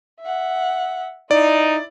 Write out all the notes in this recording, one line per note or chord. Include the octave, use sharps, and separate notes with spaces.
E5 F#5
D#4 E4 D5